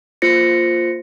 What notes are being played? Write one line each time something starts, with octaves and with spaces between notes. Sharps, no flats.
A#3 F4 C5 A#6 C#7